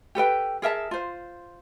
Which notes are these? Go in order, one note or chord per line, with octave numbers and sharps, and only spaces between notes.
G4 A4 B4 G5
G#4 A#4 E5 A5
F4 C5